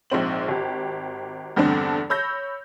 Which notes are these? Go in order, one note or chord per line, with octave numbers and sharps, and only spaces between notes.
A#1 G#2 C4 F#7
G#1 G4
E2 G2 D3 A3 C4 D4
C#5 B5 E6 G6 A#6